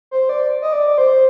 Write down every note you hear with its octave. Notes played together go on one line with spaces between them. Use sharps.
C5
D5
D#5
D5
C5